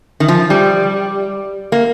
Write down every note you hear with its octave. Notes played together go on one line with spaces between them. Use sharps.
D#3
F3
G3
A#3